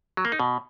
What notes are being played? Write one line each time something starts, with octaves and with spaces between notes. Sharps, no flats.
F#3
A#3
D#4
B2